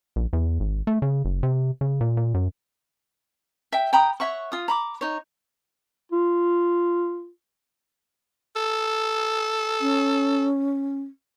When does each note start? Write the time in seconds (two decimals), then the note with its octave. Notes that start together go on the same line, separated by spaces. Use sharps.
0.16 A#1
0.33 E2
0.60 G#1
0.87 A3
1.02 C#3
1.25 F#1
1.43 C3
1.81 C#3
2.01 A#2
2.17 A#2
2.34 F#2
3.72 E5 G5
3.93 G5 A#5 B5 D#6
4.20 C#5 E5 F#5 C#6
4.52 F4 D#6
4.68 A#5 B5 D6
5.01 D#4 C#5
6.12 F4
8.56 A4
9.81 C#4